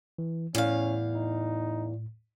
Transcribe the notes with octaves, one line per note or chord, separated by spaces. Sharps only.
E3
E2 A2 C#4 F5
D#4